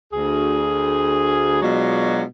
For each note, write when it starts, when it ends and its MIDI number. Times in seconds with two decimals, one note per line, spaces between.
0.13 1.61 38
0.13 1.61 68
1.62 2.23 47
1.62 2.23 54
1.62 2.23 56
1.62 2.23 62
1.62 2.23 65
1.62 2.23 66